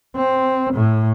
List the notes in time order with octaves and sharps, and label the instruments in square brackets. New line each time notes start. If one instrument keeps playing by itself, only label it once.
[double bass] C4
A2